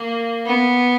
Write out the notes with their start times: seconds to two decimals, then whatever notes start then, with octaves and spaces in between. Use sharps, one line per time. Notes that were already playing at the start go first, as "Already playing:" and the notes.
Already playing: A#3
0.45 B3